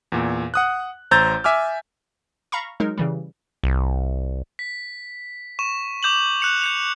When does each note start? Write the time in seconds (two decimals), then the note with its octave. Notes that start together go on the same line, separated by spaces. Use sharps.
0.12 E2 A#2
0.54 F#5 D#6 F#6
1.11 A1 C5 A#5 E6 G6 A6
1.44 E5 G#5 D6 F6
2.52 F5 A#5 B5 C#6
2.80 F#3 G#3 D#4 A#4
2.98 C#3 E3 G3
3.63 C2
4.59 B6
5.59 C#6 E7
6.03 D6 G6 E7 F#7
6.40 F#6 C#7 F7
6.62 G6 C#7 F7